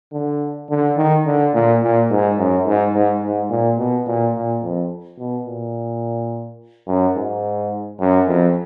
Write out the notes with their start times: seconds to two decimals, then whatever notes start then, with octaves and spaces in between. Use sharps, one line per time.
0.13 D3
0.69 D3
0.97 D#3
1.26 D3
1.54 A#2
1.82 A#2
2.10 G#2
2.38 F#2
2.66 G#2
2.93 G#2
3.22 G#2
3.50 A#2
3.78 B2
4.06 A#2
4.34 A#2
4.63 F2
5.19 B2
5.46 A#2
6.87 F#2
7.16 G#2
8.00 F#2
8.27 F2